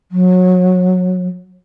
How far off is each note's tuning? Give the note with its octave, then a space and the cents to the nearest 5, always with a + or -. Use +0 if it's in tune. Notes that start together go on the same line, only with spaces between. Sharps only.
F#3 -20